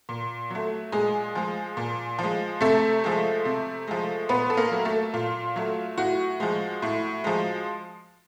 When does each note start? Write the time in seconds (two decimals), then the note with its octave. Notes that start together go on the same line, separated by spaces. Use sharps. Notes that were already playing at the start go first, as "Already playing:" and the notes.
0.09 A#2
0.50 F#3 A3
0.92 A#2 G#3 G#4
1.35 F3 G#3
1.77 A#2
2.19 F3 G#3
2.61 C3 A3 A4
3.04 F3 G#3
3.45 C3
3.87 F3 G#3
4.29 A#2 B3 B4
4.50 A4
4.57 A#3 A#4
4.72 F#3 A3
4.85 A3 A4
5.14 A#2 F4
5.56 F#3 A3
5.98 A2 F#4
6.40 F3 G#3
6.82 A2
7.24 F3 G#3